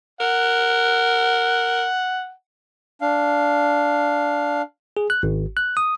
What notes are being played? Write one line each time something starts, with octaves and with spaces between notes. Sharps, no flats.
A#4 F#5
D4 F5
G#4
F#6
G#1
F#6
D#6